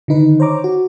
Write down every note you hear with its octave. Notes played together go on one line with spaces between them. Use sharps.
D3 D#3 D#4 B4
C5 C#5 A#5 D6
F#4